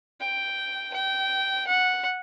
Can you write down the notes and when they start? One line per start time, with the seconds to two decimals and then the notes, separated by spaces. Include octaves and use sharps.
0.21 G5
0.93 G5
1.67 F#5